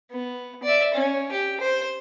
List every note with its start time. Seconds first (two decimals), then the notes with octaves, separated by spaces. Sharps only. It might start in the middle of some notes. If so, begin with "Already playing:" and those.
0.11 B3
0.63 D5 E5
0.94 C#4
1.32 G4
1.60 C5